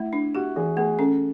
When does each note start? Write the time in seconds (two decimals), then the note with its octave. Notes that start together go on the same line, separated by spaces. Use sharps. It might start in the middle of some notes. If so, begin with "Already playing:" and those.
Already playing: A3 E4
0.13 D4
0.35 F#4 G4
0.56 E3 G#4
0.77 A3 G#4
0.98 C#4 A4